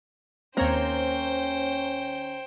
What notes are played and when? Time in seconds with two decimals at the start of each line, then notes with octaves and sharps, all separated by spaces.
0.57 D#2 A#3 C4 C#4 C5 C#5 G5 A#5